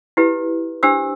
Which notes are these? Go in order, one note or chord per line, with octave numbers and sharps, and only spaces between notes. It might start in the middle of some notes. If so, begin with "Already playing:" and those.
E4 G4 B4
D4 G4 C5 E6